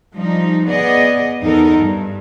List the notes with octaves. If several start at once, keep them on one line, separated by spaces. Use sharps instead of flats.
F3 G3 D#4
B3 G#4 D5 D#5
E2 B3 D#4 A4 A#4
G2